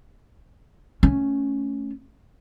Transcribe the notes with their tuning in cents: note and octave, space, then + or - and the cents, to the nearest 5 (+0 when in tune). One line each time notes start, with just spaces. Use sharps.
A3 +0 C#4 +0